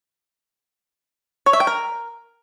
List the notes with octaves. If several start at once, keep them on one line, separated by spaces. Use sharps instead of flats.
C#5
E5
G5
A#4